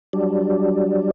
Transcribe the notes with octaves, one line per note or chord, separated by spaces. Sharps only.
F#3 G3 D4